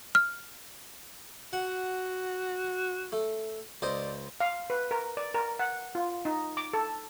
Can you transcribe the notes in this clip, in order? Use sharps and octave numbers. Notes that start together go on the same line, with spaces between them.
F6
F#4 F#5
A3
C#2 C5 D5 D#5
F5
B4
A#4
D5
A#4
F#5
F4
D#4
D6
A4